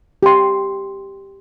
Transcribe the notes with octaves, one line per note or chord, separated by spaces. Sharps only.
G4 C6